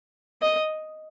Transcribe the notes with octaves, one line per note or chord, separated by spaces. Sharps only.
D#5